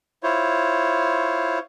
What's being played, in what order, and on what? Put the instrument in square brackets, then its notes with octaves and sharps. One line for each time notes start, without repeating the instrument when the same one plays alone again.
[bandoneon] E4 F4 C5 C#5